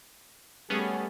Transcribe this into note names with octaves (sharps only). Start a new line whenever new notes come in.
G3 A3 B3 C#4 G#4